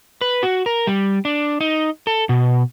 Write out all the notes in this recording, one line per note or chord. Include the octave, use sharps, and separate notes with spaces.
B4
F#4
A#4
G3
D4
D#4
A4
B2